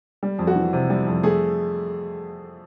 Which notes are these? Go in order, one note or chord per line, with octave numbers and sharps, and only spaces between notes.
G3
F2
F#4
E3
C3
G3
F2
A3 G#4